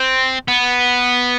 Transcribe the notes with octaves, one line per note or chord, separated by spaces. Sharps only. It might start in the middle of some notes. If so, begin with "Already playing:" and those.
Already playing: C4
B3